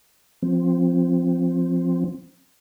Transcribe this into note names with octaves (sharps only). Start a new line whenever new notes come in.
F3 C4